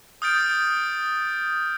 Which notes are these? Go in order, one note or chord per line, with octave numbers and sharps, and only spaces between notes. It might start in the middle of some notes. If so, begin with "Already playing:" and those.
D#6 F6 G6 A6 D7